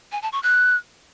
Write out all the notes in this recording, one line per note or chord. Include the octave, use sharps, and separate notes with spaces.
G#5
A5
C#6
F#6